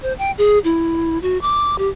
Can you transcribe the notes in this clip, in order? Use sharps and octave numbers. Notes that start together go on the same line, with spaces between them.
C5
G5
G#4
E4
F#4
D6
G4